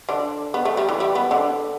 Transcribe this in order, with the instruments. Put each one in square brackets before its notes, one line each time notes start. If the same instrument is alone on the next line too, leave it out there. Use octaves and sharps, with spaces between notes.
[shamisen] D3 D4
B3
A3
G3
E3
G3
B3
D3 D4